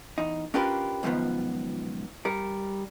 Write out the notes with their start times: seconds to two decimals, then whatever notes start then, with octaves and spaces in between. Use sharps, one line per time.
0.18 E2 D#4
0.54 C#4 D4 F4 G4 A#4 B4
1.03 C#2 F#2 B2 D#3 F3 B3
2.25 G3 A#4